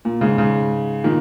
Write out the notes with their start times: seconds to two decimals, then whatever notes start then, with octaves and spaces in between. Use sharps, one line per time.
0.05 A#2
0.21 G#2 C#3
0.38 G#2 C#3
1.04 A#2 D#3